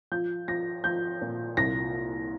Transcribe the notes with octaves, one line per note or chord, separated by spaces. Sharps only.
F3 G6
F3 A#6
F3 G6
A#2
C2 A#6